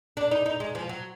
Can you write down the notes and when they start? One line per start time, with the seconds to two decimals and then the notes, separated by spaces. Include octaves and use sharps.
0.17 D4
0.31 D#4
0.46 D#4
0.60 G#3
0.75 F3
0.89 F#3